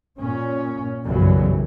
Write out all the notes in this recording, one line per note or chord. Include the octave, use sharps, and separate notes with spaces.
A#2 C#4
B1 F#2 C#3 E3 F#3 G3